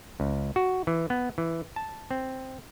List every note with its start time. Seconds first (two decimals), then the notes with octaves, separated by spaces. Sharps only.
0.20 C#2
0.56 F#4
0.87 E3
1.10 B3
1.38 E3
1.76 A5
2.11 C4